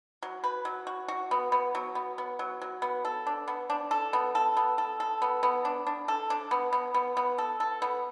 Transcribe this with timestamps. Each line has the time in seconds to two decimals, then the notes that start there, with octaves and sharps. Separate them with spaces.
0.23 F#3
0.44 B4
0.65 F#3
0.87 F#4
1.08 F#4
1.31 B3
1.52 B3
1.75 F#3
1.95 B3
2.18 B3
2.39 F#3
2.61 F#3
2.82 B3
3.05 A4
3.27 D4
3.48 B3
3.70 D4
3.91 A4
4.13 B3
4.35 A4
4.57 B3
4.78 A4
5.00 A4
5.22 B3
5.43 B3
5.65 D4
5.87 D4
6.08 A4
6.30 D4
6.51 B3
6.73 B3
6.94 B3
7.17 B3
7.38 A4
7.60 A4
7.82 B3